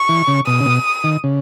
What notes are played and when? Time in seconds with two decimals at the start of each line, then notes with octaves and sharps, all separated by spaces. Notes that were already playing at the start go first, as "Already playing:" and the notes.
Already playing: C#6
0.09 E3
0.27 C#3
0.46 B2 D#6
0.60 C#3
0.65 B2
1.04 D#3
1.24 C#3